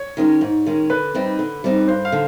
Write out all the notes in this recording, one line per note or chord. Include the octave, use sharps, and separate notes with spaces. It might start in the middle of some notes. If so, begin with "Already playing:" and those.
Already playing: C#5
D#3 G#3 C#4
G#2
D#3 G#3 C#4
D3 B4
G3 C4 D#4
D3
G3 C4 D#4
G2 C5
F5
D3